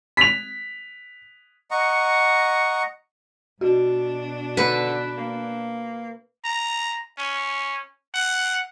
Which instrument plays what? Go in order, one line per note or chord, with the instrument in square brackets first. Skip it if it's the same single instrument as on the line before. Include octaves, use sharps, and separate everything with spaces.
[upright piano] B6 F7
[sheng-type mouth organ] D#5 F#5 A#5 C#6
[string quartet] B2 D4 [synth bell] F#4
[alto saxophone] D3 [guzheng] B4
[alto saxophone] A#3
[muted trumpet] A#5
C#4
F#5